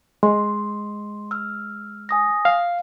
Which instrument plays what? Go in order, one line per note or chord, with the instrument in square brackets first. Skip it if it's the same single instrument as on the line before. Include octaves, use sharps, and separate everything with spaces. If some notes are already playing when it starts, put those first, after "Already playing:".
[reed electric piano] G#3 [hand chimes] C6
[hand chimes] E6 F6
G#5 D#6 A#6
[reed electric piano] F5